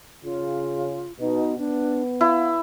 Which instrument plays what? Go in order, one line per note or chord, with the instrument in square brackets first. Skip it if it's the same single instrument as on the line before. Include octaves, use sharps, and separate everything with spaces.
[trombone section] C#3 [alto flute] F4
[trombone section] B2 [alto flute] D#4
[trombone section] B3 [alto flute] D4
[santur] E4 [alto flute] F5